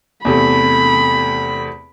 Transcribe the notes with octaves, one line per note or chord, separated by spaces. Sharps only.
E2 C3 A3 B5